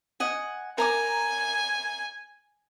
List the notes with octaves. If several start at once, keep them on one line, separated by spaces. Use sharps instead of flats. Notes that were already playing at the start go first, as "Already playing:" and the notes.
D#5 F#5 G#5
A#4 G#5 A#5 D6